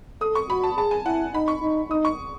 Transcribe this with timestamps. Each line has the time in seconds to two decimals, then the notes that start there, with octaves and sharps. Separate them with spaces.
0.21 A4 D#6
0.35 C#6
0.49 F#4 B5
0.64 A5
0.77 G#4 A5
0.91 G#5
1.06 E4 F#5
1.34 D#4 B5
1.48 C#6
1.62 D#4
1.90 D#4 D#6
2.05 C#6